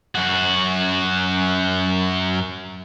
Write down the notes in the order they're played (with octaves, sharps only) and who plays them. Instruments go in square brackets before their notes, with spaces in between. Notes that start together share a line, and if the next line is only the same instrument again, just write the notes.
[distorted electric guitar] F#2 F#4